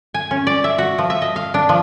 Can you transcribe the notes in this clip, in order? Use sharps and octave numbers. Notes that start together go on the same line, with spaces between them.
G#5
C#4
D5
E5
F#4
F3
E5
D#5
F5
D4
F3